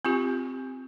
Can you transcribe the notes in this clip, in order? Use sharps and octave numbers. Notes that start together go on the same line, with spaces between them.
C4 F4 G4